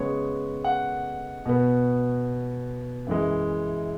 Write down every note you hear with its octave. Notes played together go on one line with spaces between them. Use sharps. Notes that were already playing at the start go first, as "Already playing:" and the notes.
Already playing: C#3 G#3 B3 C#5
F#5
B2 B3
F#2 E3 G#3